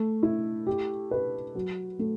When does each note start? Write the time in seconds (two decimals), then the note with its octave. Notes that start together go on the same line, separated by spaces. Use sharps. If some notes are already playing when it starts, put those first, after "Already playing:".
Already playing: A3
0.23 E4
0.67 G4
1.11 B4
1.55 F#3
1.99 A3